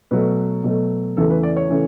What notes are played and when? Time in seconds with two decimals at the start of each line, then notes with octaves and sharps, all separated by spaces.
0.11 B2 F#3 A3 B4
0.64 B2 F#3 A3
1.17 E2 C#3 E3 A3 A4
1.31 B4
1.43 D5
1.56 C#5
1.70 C#3 E3 A3